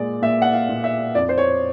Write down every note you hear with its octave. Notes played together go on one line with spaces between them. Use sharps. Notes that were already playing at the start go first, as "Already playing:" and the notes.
Already playing: A#2 G#3 D5
A#2 E5
F#5
F5
A#2
E5
F2 D5
C5
C#5